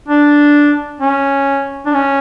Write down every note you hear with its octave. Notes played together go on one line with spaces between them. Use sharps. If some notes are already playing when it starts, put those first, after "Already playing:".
D4
C#4
D4
C#4